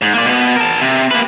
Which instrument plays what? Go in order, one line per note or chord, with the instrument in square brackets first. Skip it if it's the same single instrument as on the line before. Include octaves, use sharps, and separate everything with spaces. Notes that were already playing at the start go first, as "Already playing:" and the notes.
[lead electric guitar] G#2
A#3 D5
B2 B3
A#4 A5
C3
A#3 B4